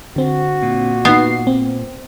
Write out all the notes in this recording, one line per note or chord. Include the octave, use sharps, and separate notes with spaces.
D3 C4 F#4
A#2
B3 D#4 C7
C4